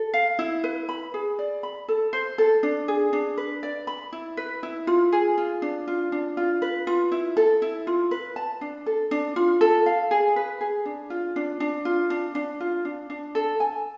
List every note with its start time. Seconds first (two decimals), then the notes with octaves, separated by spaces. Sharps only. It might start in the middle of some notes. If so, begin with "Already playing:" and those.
Already playing: A4
0.14 F5
0.39 E4
0.64 B4
0.89 B5
1.14 G#4
1.39 D5
1.63 B5
1.88 A4
2.13 C5
2.38 A4
2.63 D4
2.88 G#4
3.13 D4
3.38 B4
3.63 D5
3.87 B5
4.13 E4
4.37 B4
4.63 E4
4.87 F4
5.12 G#4
5.38 F4
5.62 D4
5.88 F4
6.12 D4
6.37 F4
6.62 B4
6.87 F4
7.12 E4
7.37 A4
7.62 E4
7.87 F4
8.11 B4
8.36 A5
8.61 D4
8.86 A4
9.11 D4
9.36 F4
9.61 A4
9.86 F5
10.11 G#4
10.36 B4
10.61 G#4
10.86 D4
11.10 F4
11.36 D4
11.60 D4
11.85 F4
12.10 D4
12.35 D4
12.60 F4
12.85 D4
13.10 D4
13.35 A4
13.60 G#5